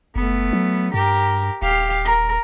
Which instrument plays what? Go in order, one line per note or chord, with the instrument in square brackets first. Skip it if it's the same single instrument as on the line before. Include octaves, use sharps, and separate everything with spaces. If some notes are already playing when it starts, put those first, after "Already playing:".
[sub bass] F#1 [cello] A3 B3
[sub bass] F#3
[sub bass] G2 [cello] G4 A#4
[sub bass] D#1 [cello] G4 F5
[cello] A#4